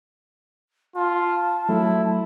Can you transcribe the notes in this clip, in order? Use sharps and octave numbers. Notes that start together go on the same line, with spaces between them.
F4 A5
F#3 A3 E4